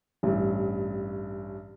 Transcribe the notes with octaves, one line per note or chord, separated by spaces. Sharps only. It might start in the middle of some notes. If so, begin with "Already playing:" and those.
A1 G2